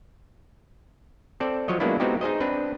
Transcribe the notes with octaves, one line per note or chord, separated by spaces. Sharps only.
C4 A4 D5
F3 F#3 C#5 D#5
F#3 G#3 A#3 B3 D4 E4
G#3 B3 C4 D#4 F#4 G4
D#4 G#4 C5 D#5
C4 D4 B4